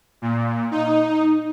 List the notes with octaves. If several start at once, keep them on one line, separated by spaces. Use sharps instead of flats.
A#2
D#4